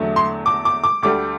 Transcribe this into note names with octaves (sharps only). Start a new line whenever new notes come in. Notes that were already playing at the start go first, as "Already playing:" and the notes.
Already playing: E2 D3 F#3 A3
C6
D6
D6
D6
D2 D3 G3 D6